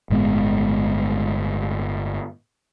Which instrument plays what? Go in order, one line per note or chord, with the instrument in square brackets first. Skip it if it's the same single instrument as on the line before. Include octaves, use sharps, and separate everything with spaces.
[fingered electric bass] G1 A2 G#3 B3